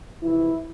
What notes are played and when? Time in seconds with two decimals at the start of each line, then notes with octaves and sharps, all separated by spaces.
0.23 F2 C3 E3 E4